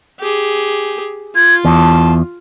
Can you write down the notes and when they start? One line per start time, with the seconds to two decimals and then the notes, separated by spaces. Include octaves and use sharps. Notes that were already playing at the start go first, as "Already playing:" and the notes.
0.19 G4 G#4
1.35 F4 G#6
1.65 E2 A5